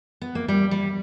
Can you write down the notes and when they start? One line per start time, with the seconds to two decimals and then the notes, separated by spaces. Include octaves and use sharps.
0.21 B3
0.35 A#3
0.48 G3
0.71 G3